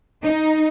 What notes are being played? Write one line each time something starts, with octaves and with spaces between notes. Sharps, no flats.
D#4